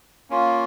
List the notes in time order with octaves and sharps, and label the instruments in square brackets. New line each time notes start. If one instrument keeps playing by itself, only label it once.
[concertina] A#3 C#4 F4